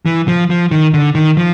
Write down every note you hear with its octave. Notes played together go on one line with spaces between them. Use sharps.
E3
F3
F3
D#3
D3
D#3
F3